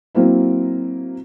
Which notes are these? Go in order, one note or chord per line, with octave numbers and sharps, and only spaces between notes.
F#3 A#3 C4 E4